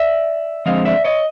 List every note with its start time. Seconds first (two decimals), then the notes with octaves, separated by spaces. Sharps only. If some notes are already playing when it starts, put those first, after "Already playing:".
Already playing: D5 E5
0.66 D3 F3 G#3 C4 D#5 F5
0.85 D5 E5
1.04 C#5 D#5